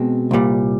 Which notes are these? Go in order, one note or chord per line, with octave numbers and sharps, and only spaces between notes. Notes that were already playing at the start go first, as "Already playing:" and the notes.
Already playing: B2 G#3 C4
C2 A#2 G3